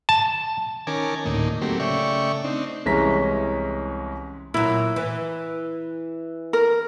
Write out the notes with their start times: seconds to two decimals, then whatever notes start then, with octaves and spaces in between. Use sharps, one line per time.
0.09 A5
0.87 D#3 C#4 A#4 G#5 A5 D6
1.25 D2 A2 A#3 D#4
1.62 F#3 A3 A#3 C4 G4
1.80 C#3 A3 D5 E5 G5 C#6
2.44 C4 D4 D#4
2.86 C2 E3 G#3 C#4 A#5 B6
4.54 A#2 F#3 E4
4.96 E3
6.53 A#4